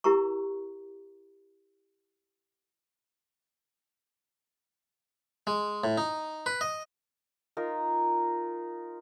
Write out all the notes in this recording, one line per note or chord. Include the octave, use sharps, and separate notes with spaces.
E4 G4 A#4 A#5 C#6
G#3
A2
D#4
B4
D#5
D#4 F4 A#4